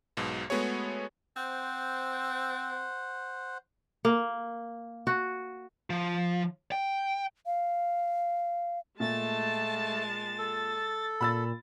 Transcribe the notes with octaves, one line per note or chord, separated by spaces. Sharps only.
B1 G#2 B2
G#3 A3 B3 F#4 G#4 C#5
C4 C5 F#5
A#3
F#4
F3
G5
F5
A#2 G#3 A3 A5 A6
A4
A#2 B5 E6 A6